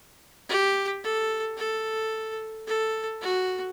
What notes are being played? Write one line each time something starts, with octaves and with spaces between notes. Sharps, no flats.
G4
A4
A4
A4
F#4